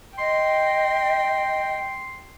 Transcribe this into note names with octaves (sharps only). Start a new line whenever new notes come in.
D#5 G5 C6